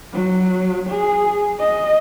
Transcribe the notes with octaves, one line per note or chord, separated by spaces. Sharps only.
F#3
G#4
D#5